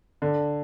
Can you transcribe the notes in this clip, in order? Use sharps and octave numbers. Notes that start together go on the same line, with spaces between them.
D3